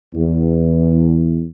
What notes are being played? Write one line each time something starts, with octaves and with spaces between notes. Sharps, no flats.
E2